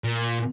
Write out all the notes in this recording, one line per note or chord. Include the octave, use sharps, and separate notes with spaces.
A#2